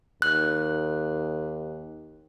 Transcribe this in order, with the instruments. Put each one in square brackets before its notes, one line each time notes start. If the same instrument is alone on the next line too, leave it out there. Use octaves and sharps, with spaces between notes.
[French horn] D#2 [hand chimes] F#6